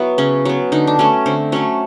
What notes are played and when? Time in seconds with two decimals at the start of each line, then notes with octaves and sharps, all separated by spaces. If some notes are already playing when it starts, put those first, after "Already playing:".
Already playing: F#3 B3 E4
0.18 C#3 C#4
0.45 F#3 B3
0.72 D3 D#4
0.87 D4
0.99 F#3 A3 C#4
1.26 D3 C4
1.52 F#3 A3 C#4